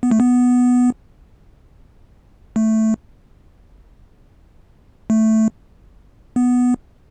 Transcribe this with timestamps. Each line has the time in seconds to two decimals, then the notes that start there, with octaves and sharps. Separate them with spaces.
0.03 B3
0.11 A3
0.20 B3
2.56 A3
5.10 A3
6.36 B3